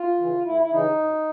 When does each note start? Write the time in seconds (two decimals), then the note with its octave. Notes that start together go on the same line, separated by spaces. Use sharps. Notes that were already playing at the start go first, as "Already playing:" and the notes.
Already playing: F4
0.18 C#3 E3
0.44 D2 E4
0.61 E4
0.71 C#3 E3 D#4
0.97 F#2